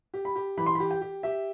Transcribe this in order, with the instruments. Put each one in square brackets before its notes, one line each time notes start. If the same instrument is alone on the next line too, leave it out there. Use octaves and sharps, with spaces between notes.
[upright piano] G4
[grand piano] B5
[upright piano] G4
[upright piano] E3 [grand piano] B5
[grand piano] C6
B5
[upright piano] G4
[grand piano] G5
[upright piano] G4
[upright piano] G4 [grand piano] E5